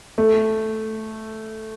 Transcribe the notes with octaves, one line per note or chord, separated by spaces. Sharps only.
A3